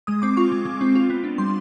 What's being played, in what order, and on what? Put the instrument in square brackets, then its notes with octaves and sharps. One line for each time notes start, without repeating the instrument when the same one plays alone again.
[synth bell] G#3 D#6
C4 D6
F4 C#6
G#3
G#3
C4
F4
B3
D4
G3 C6